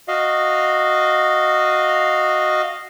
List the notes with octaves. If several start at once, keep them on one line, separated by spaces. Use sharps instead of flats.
F#4 D#5 F5